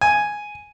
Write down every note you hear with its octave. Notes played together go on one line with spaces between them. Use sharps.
G#5